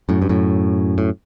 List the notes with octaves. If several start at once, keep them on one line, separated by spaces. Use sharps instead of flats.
F#2 A2
G2
F#2 A2
A2